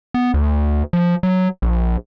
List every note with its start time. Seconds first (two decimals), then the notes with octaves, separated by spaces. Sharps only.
0.14 B3
0.34 D2
0.93 F3
1.23 F#3
1.62 A#1